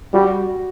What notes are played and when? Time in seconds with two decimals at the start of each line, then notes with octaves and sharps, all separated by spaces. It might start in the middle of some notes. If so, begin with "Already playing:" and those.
0.14 G3 F#4